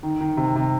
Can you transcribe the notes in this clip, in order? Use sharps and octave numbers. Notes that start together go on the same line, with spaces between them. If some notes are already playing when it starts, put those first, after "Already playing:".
D#3
D#3
C3
C3